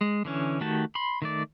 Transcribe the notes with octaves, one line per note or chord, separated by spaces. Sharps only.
G#3
D3 E3 C#4
D#3 A3 F#4 G4 A5
B5 C6
D#3 A3 D5